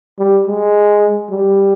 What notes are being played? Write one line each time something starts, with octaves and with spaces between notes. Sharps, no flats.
G3
G#3
G3